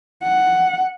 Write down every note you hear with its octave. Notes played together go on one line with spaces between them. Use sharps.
F#5